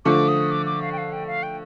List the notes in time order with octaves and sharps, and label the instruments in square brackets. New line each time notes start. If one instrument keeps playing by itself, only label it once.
[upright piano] D3 F3 A3 [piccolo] D6
[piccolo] D#6
D6
D6
F5
G5
F5
G5
F5
G5